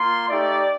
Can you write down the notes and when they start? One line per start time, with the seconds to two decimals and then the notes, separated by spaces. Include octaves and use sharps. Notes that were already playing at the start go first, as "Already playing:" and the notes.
Already playing: A#3 F4 C6
0.29 A3 D#4 G4 D5